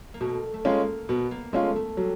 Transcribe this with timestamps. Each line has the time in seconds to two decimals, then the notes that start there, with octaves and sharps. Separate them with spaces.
0.14 A#3
0.20 B2 A3
0.54 A3
0.65 G#3 A#3 C#4 F4
1.09 B2 B3
1.31 A#3
1.53 G#3 A3 C#4 F4
1.76 A3
1.97 F#3 G3